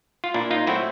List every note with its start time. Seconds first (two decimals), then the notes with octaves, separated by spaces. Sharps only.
0.24 F4
0.34 A#2 D4 E4
0.51 D#4 F4
0.67 F#3 A3 C4 E4 F#4